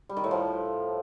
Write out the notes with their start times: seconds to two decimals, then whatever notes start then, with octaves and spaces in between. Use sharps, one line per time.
0.09 G3
0.17 D#3
0.24 A2
0.31 F3